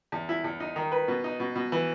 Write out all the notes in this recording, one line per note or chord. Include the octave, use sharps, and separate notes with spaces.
E2
E4
E2
D#4
D#3
B4
B2
D#4
B2
B2
E3